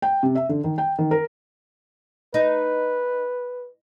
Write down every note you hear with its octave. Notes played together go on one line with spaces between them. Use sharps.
G5
C3
E5
D3
D#3
G5
D#3
A#4
D#4 B4